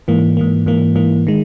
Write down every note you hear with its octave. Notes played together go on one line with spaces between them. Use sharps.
G#2 E3 A#3
G#2 E3 A#3
G#2 E3 A#3
G#2 E3 A#3
D#3 G#3